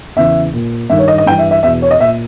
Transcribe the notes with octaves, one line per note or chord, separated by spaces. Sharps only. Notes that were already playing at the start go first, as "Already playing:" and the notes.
E2 C#3 E3 E5
A#2
G2 D#3 E5
C#5
D#5
D#5
G2 E3 G5
E5
E5
E2 B2 E5
C#5
D#5
A#2 E5